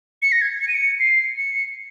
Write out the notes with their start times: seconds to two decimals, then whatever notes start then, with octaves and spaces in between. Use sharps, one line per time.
0.22 C#7
0.32 A#6
0.41 G#6
0.61 C#7
0.68 D#7
0.75 C#7
1.00 C7
1.37 C#7